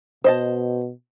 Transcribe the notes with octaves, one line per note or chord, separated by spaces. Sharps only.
B2 C5 D#5 A5